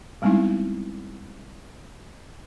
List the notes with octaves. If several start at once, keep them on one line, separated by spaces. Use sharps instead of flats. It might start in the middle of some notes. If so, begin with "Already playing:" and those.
G3 G#3 B3 C4 D#4 E4